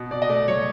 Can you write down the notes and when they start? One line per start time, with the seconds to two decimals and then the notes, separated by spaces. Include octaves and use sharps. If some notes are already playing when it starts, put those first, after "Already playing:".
Already playing: B2
0.11 B2 D5
0.22 D#5
0.29 A3 D5
0.48 F#3 C#5